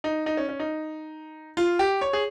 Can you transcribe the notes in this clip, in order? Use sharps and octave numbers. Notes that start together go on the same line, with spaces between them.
D#4
D#4
C#4
C#4
D#4
F4
G4
C#5
G#4